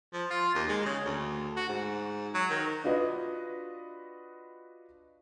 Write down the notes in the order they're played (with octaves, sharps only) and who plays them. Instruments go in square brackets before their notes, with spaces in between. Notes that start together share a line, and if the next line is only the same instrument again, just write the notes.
[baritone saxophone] F3
F4
D#2
G#3
C#3
D2
F#4
G#2
F#3
D#3
[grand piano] D4 F4 F#4 B4 D#5